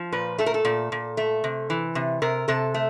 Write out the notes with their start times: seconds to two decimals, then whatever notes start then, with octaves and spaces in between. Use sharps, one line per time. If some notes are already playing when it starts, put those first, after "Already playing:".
Already playing: F3
0.12 A#2 B4
0.39 A3 A4
0.46 A#4
0.54 A4
0.65 A#2
0.92 A#2
1.17 A3
1.44 C3
1.70 E3
1.95 C3
2.22 C3 A#4
2.48 C3 A4
2.74 A3